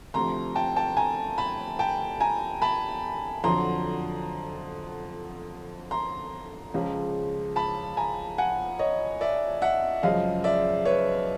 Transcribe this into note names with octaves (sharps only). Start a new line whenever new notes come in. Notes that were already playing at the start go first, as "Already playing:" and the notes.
D2 C3 F3 A#5 C6
G5 A5
G5 A5
G#5 A#5
A5 B5
G5 A5
G#5 A#5
A5 B5
F2 D3 F#3 A#5 C6
A#5 C6
C#2 C#3 F3 G#3
A5 B5
G#5 A#5
F#5 G#5
C#5 D#5
D5 E5
E5 F#5
F#2 C#3 F3 G#3 D#5 F5
D5 E5
B4 C#5